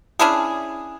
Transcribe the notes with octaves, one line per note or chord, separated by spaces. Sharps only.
C#4 D4 E4 G#4